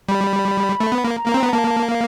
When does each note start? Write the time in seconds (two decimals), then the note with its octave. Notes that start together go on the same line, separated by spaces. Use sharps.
0.09 G3 B5
0.80 A3
0.92 B3
1.04 A#3
1.16 A#5
1.26 A#3
1.34 C4
1.43 B3
1.52 A#3 A5
1.88 F5